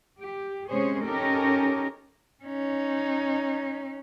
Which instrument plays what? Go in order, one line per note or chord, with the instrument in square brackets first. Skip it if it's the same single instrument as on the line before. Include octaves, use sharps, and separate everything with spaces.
[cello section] G4
C3 G#3 C#4 G#4 C5 C#5
C#4 D#4 G4 A4 A#4
[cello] C#4 D#4